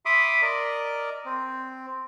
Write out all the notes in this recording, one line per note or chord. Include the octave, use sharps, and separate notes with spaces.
E5 B5 C6 D6 D#6
A#4 D5 D#5
C4